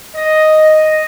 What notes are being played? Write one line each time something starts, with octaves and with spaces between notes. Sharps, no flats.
D#5